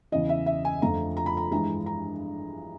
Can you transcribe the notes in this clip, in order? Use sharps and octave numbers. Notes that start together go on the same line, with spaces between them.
E2 C#3 E3 D#5
E5
E5
G#5
F2 D3 F3 A3 A#5
A#5
B5
A#5
G2 E3 G#3 A#5
A#5